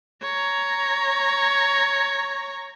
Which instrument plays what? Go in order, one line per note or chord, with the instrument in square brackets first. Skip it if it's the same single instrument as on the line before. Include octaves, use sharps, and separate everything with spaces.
[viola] C#5 A#5